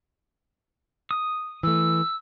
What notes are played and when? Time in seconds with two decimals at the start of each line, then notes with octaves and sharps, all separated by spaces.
1.11 D#6
1.63 E3 A3 E6